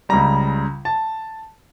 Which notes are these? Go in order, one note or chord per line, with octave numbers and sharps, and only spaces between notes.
C#2 C#3 G3 A#5
A5